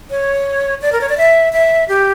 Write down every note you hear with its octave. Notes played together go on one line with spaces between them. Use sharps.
C#5
D5
A#4
C#5
D5
E5
E5
G4